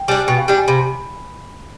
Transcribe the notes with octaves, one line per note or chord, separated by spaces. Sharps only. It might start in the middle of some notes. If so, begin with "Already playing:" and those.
Already playing: G5
G3 D4 G#5
B2 G5
F5
G3 D4 G5
G#5
C3 B5